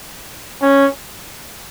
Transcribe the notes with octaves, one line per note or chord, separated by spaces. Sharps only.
C#4